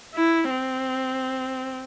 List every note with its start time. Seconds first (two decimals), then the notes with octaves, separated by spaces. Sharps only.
0.15 E4
0.50 C4